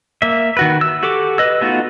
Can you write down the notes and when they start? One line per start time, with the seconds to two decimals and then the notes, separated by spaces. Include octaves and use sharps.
0.22 A#3 E5
0.57 D#3 F#4 B4
0.81 E6
1.03 F#4 G4 A4 D6
1.38 B4 D#5 E6
1.61 A3 B3 D#4 F4 F#4